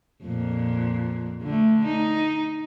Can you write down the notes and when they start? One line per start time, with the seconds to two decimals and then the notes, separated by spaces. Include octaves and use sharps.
0.24 F2 A#2
1.43 D3 A3
1.85 D#4